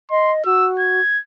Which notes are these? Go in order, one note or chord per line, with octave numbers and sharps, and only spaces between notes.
D#5 C6
F#4 E6
G#6